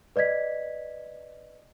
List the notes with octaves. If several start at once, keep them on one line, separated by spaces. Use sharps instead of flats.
B4 D5 D#5 G#6 B6